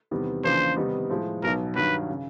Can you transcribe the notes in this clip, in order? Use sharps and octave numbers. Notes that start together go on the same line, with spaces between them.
E2 C3 D#3 G3 B3
E2 C#3 F3 A#3 D4 C5
C3 D#3 G3 B3 D#4
A2 F3 G#3
B1 B2 F#3 A#4
G2 D#3 F#3 B4
C#3